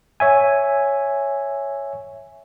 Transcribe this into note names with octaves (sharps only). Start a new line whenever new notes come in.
C#5 E5 G#5